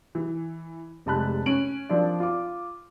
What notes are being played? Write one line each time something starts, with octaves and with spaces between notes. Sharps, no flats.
E3
F1 C3 G#3 A5 B5 F#6
C#4 D7 F#7
F3 C4 D4 A#4 D5
F4 D6